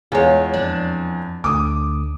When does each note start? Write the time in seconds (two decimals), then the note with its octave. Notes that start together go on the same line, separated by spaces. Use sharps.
0.12 E2 G#3 F4 C#5
0.54 F2 F3 D4
1.44 D2 D3 D6 D#6